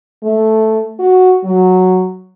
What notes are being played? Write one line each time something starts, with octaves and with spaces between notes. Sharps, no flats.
A3
F#4
F#3